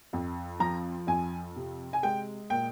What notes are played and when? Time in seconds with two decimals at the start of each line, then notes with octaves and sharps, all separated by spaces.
0.13 F2
0.60 F3 A#5
1.07 F2 G#5
1.56 C3
1.93 G#5
2.03 G#3 G5
2.50 A#2 G5